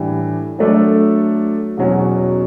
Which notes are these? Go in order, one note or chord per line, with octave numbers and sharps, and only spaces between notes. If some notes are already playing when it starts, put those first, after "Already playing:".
Already playing: A2 E3 G3 D4 G4
F#3 A3 D4 A4 D5
E2 B2 F#3 C#4